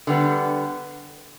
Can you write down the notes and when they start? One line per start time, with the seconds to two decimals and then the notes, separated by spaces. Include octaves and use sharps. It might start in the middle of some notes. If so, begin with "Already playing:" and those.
0.07 D3 G3 B3